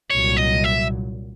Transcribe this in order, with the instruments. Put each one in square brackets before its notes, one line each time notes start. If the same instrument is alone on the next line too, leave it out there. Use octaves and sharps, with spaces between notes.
[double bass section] C2 A#2 F#3 [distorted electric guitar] C#5
[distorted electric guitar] D#5
E5